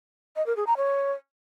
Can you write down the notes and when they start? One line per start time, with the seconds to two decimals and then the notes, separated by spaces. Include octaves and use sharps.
0.36 D#5
0.46 A#4
0.56 G#4
0.67 A#5
0.77 C#5